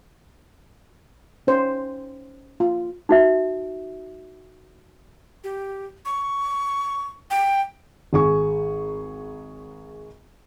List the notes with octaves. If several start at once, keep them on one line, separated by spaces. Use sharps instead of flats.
C#4 D#4 C5
F4
D#4 F#4 E5
G4
C#6
G5
G#1 G#4 C#6